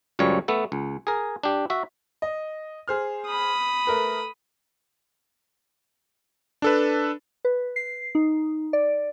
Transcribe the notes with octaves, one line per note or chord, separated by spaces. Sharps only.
C#2 F#2 F3 G3 C#5
A3 B3 A4
C#2
G#4 A#4
D4 G4
F#4 E5
D#5
G#4 C5 F6
B5 D#6
A3 A#4 B4
D4 A4 B4
B4
C7
D#4
D5